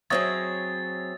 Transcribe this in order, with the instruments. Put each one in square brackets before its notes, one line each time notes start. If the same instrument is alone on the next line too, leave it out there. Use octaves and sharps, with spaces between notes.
[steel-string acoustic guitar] F#3 C4 G#4 [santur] C#5 D#5 E5 [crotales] A6